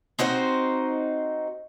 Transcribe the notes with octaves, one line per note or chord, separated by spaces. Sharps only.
C4 D#4 F#4 C5